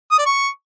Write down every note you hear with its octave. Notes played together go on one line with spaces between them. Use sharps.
D#6
D5
C#6